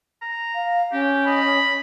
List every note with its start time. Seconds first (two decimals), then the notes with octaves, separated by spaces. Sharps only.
0.22 A#5
0.55 F5
0.92 C#4 G4
1.26 D#5 B5